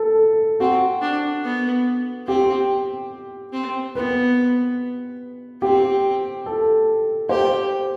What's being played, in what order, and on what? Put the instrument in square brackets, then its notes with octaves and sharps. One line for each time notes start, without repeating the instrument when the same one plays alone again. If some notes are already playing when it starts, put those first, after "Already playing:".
Already playing: [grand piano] A4
[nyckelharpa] C4 [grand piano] F#4
[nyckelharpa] D4
B3
[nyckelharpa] C4 [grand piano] G4
[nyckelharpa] C4
[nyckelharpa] B3 [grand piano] B4
[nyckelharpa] C4 [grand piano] G4
[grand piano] A4
[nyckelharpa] G4 [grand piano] C5